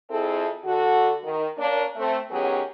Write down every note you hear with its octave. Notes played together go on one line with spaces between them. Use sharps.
F2 C4 E4 G#4 A4
D3 F#4 A4
D#3
A#3 C#4 D4
A3 C4
D#3 F#3 B3 C#4 G4 G#4